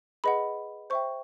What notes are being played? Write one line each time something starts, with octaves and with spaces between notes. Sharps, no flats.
G#4 B4 D#5 F#5 B5
C5 E5 G5 C#6